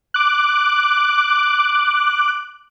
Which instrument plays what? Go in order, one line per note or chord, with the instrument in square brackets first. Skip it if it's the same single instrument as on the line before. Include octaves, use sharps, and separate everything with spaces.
[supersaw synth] D6 F#6